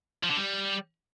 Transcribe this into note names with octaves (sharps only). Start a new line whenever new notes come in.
F3
D3
G3